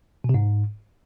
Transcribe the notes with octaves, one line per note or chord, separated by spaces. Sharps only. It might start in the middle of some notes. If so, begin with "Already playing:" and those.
B2
C3
G#2